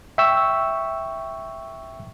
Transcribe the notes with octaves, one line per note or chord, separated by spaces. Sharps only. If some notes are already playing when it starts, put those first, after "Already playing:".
E5 G5 C#6 E6